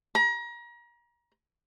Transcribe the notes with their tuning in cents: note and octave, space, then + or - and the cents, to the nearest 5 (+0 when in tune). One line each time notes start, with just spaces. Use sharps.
A#5 +35